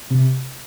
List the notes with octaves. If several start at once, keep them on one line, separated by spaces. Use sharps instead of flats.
C3